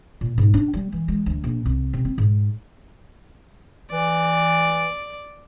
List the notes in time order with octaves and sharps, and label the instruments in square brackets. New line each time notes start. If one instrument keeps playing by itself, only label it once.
[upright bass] A#2
G#2
D4
G3
E3
G#3
D2
A#1
C2
C3
C4
G#2
[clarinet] E3 [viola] D5